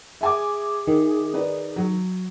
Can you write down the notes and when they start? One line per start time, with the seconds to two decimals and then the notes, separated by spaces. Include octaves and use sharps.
0.21 G#4 E5 G#5 D6
0.87 D#3
1.33 D#4 B4 D5
1.76 F#3